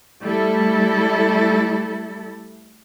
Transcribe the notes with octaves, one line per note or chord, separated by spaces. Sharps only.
G3 A3 E4 A4